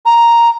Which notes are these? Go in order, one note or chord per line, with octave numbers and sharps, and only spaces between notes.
A#5